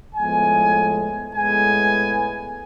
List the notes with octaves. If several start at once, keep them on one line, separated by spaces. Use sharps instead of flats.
A2 F3 G#3 B3 G#5
A2 G#3 B3 G#5